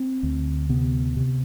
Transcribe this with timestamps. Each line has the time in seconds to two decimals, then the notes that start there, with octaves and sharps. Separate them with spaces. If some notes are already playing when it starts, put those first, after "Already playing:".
Already playing: C4
0.23 D2
0.69 C3 B3
1.17 C3